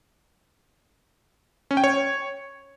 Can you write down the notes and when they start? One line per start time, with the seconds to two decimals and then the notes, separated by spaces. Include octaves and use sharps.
1.71 C#4
1.77 G5
1.84 C#5